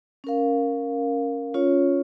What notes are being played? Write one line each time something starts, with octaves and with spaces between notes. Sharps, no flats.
C#4 A#4 F5
C#4 F4 C#5